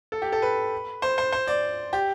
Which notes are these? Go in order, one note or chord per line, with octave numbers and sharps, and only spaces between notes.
A4
G4
A4
B4
C5
C5
C5
D5
G4